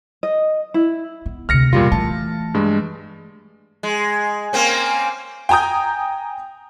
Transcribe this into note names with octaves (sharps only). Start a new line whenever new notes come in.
D#5
E4
B3
D2 C3 F6 A#6 C#7
E2 A#2 G3 F4
E3 A3 A5
G2 G#3
G#3
A#3 C4 C#4
G5 G#5 A#5 D#6 G6